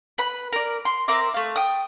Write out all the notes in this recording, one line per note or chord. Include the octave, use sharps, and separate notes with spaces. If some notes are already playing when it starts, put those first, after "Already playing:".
B4 B5
A#4 D5
C6
C4 A#4 E5 D6
A3 F5
G5 D#6